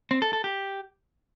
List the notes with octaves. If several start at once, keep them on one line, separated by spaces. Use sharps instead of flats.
C4
A4
A4
G4